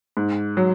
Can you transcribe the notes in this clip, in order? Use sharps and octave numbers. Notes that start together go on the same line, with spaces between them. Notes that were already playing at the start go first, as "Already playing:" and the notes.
G#2
F#3